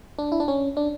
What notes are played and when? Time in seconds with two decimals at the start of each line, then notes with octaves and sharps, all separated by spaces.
0.19 D4
0.32 E4
0.40 D4
0.48 C#4
0.77 D4